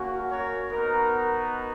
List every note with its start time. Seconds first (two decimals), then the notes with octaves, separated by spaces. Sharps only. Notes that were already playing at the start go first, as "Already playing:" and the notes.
Already playing: A#3 C#4 F#4
0.31 A#4 C#5
0.70 B3 D#4 F#4 A#4